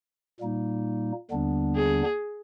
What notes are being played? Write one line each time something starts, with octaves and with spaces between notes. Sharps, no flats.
A#2 G3 A#3 D#4
D#2 D3 G3 B3 D4
G#4